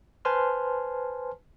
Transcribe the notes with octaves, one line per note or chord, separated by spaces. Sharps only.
B4 C5 G#5 A5 C6 F6